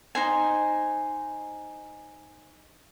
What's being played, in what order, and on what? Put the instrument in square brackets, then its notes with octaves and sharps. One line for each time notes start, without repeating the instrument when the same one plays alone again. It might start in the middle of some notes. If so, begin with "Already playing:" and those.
[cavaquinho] D#4 C5 G#5